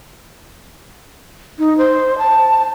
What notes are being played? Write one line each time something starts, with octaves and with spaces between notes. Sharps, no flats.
D#4
C5
A5